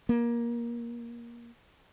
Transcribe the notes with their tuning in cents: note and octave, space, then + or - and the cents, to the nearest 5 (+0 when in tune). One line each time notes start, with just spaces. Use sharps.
A#3 +20